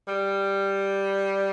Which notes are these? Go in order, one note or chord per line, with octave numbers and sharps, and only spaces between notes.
G3